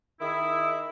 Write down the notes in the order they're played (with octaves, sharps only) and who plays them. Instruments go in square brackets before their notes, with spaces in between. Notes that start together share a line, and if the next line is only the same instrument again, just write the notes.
[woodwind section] D#3 E4 [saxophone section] G#4 E5